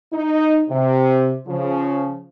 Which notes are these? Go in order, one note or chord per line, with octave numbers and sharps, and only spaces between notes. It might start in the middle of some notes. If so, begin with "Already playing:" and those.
D#4
C3
C#3 F3